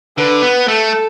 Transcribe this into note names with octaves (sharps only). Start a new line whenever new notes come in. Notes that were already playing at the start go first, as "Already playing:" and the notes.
D3 B4
B3
A3 A4